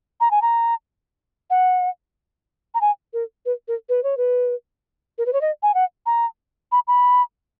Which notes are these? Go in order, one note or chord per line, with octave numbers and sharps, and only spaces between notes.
A#5
G#5
A#5
F#5
A#5
G#5
A#4
B4
A#4
B4
C#5
B4
A#4
B4
C#5
D#5
G#5
F#5
A#5
B5
B5